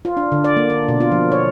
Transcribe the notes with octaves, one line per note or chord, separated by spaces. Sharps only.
F4
D4
D3
D5
A#3
D4
B2
F4
F3
C#5